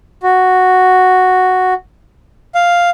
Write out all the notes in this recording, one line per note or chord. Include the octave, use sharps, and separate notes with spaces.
F#4
F5